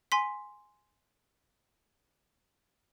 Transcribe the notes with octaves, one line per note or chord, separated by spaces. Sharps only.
G#5 C6 B6